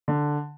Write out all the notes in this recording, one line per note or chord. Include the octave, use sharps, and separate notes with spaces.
D3